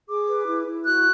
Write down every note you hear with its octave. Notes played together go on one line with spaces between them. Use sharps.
G#4 D6
B4
E4
E4
F#4 F#6